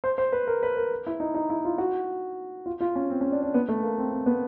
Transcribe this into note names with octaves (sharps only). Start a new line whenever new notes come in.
C5
C5
B4
A#4
B4
A#4
E4
D#4
D#4
E4
F4
F#4
F4
F4
C#4
C4
C#4
D4
D4
B3
A3
A#3
C4
C4
B3